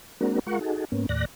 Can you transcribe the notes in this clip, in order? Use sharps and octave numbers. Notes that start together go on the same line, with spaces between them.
G#3 A#3 C4 D4 F#4 A#4
G#3 F4 A#4 F#5 C#6
D#4 F#4 G#4 A4
G#2 A#3 B3 C#4
D#2 A2 D5 F#6 A#6